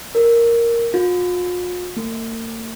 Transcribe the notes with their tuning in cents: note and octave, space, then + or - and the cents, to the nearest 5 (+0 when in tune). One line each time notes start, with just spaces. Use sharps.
A#4 +0
F4 +40
A#3 -45